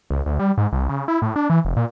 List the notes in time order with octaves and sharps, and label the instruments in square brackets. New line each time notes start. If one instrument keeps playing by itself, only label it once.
[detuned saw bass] C#2
D2
G3
G#2
C2
C#3
E4
A2
D4
E3
F1
A#2